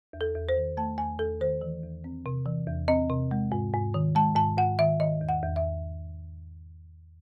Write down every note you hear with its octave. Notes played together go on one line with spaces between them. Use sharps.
E2
A4
E2
C5
D#3
A3 A5
E2 G#5
E2 A4
D#3 C5
E3
E2
C4
C3
E3
E2
C4 D#5
C3
G#3
G#2
G#2
D#3
G#3 A5
G#2 A5
G#2 F#5
D#3 E5
D#3 D#5
E2
F#5
E2
E5